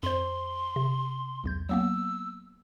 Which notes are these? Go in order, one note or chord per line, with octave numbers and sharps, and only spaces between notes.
F2 C5 C6
C3
B1 E2 G6
F#3 A#3 B3 E6